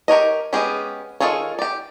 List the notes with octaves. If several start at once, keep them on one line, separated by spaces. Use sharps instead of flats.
G4 A#4 C#5 D#5
G#3 B3 C#4 G4 G#4
D#3 F4 G#4 A4 C#5
G4 D5